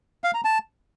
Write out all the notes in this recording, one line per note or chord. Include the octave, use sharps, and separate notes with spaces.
F5
A#5
A5